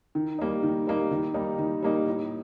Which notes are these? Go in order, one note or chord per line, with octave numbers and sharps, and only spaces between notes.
D#3
G3 A#3 D#4
D#3
G3 A#3 D#4
D#3
G3 A#3 D#4
D#3
G3 A#3 D#4
A2